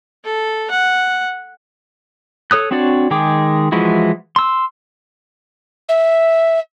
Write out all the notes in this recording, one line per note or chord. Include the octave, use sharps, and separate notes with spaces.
A4
F#5
A4 C#5 D#6 F#6
C4 D4 F#4 C#5 D5
D#3 G#3 G#4 G5 D6
E3 F3 G#3 E4 F#4
C6 E6
E5